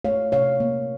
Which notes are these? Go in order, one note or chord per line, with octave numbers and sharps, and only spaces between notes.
A3 C#5 F5
C3 C#5 F5
A#3